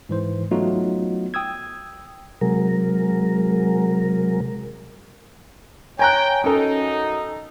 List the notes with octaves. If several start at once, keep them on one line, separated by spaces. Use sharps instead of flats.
G#2 E3 C5
F#3 A3 B3 D#4 F4 F#4
G5 D#6 E6 G#6
C3 F#3 G#3 A#4
C#5 G5 G#5 A#5 F#6
F#2 C#4 D#4 A4